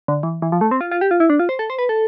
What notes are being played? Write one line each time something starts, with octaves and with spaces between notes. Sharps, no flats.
D3
E3
E3
F3
A3
C4
F4
F4
G4
F4
E4
D4
F4
C5
A4
C5
B4
A4